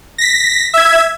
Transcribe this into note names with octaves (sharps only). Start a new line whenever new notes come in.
A#6 B6
E5 G#6